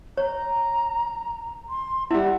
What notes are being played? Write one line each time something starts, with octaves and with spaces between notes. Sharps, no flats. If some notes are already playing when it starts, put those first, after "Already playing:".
C#5 A#5
C6
G3 E4 E5 F#5